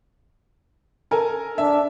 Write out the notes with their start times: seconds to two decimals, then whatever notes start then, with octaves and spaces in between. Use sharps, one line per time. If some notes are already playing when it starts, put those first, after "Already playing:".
1.11 A4 A#4 G#5
1.58 D4 E5